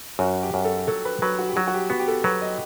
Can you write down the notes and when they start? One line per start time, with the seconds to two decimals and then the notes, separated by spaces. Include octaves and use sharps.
0.19 F#2 F#4
0.43 G4
0.54 F#2
0.65 A4
0.87 F#3 A4
1.05 B4
1.22 F#3 B4
1.39 F#4
1.49 G4
1.56 F#3 F#4
1.67 F#4
1.74 G4
1.90 B3 F#4
2.00 G4
2.08 A4
2.24 F#3 B4
2.42 D#5